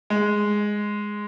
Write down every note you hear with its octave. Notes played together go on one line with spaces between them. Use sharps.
G#3